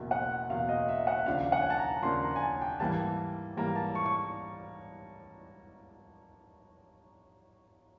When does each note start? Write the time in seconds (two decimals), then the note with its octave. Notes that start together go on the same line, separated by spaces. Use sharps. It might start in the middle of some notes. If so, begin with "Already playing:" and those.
Already playing: F#1 E2 B2
0.11 F#5
0.49 F#1 E2 B2 F5
0.69 D#5
0.89 E5
1.07 F#5
1.26 D#2 C#3 F3 A#3 D4 F5
1.52 F#5
1.62 G#5
1.70 A5
1.78 A#5
2.03 D#2 C#3 F3 A#3 D4 C6
2.23 A#5
2.36 G#5
2.42 A5
2.61 G5
2.80 G#2 E3 G3 A#3 A5
3.57 G#2 E3 G3 A#3 A#5
3.76 A5
3.95 C#6
4.06 C#6